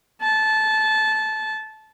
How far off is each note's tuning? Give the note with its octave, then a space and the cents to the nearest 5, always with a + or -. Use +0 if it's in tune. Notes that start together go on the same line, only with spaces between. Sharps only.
A5 -15